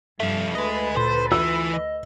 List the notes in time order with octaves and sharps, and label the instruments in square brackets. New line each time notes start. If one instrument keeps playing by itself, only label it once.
[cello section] G2 [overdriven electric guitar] F3 A3 [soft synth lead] E5
[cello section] D2 A4 B4 [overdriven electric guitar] G#4 D#5
[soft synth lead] A#2 [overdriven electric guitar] C5
[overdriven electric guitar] E3 [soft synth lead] F4 [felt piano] E6
[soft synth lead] D#5